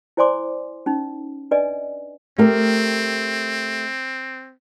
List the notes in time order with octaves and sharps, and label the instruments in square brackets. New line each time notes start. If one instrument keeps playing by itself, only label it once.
[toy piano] E4 C5 D5 G#5 C6 D6
C#4 D#4
D4 B4 D5 D#5 G#5
[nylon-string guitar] A3 G4 A#4 [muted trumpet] C4